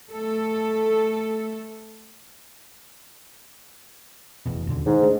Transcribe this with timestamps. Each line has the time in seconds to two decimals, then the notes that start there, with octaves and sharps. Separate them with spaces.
0.11 A3 A4
4.46 F1 E2 B2
4.67 D#2 B2 D3
4.86 G#2 D#3
5.01 A3 D4